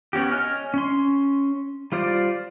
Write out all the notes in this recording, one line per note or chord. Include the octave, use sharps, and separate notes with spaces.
B3 C#4 F#4 G4
C#5 D#5 G#5 F6
C#4 C6
G3 F4 C5 D5